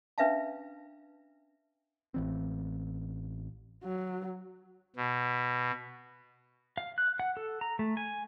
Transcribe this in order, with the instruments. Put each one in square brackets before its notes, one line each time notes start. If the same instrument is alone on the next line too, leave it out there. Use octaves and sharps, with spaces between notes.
[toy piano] C#4 D4 B4 E5 F5 A5
[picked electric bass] A1 E3 C4
[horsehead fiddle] F#3
[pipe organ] B2
[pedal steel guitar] F5
F#6
F#5
A4
A#5
A3
G#5